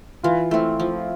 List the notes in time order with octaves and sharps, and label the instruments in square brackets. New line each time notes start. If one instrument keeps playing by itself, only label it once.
[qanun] E3 [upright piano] F4
[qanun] A3 C4 [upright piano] E4
[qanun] F3